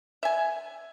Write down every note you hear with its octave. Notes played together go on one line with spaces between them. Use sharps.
E5 G#5